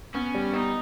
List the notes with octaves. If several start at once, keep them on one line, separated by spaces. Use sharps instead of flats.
B3 C#4
G3
B3 D#4